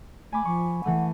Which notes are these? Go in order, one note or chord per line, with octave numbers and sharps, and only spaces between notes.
A3 G#5 B5 D6
F3 C#6 D6
E3 A3 F#5 D#7